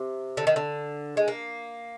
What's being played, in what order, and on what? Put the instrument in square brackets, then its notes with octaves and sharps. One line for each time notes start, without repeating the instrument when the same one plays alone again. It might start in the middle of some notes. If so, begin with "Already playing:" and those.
Already playing: [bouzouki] C3
D3
D#3
D3
G#3
A#3